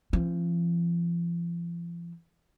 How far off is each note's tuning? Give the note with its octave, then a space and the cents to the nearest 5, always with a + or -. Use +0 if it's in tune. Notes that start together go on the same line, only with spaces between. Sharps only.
F3 -40 C4 +25